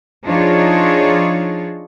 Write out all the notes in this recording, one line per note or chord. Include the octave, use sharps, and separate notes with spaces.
F3 D4 D#4 F4 G#4 C#5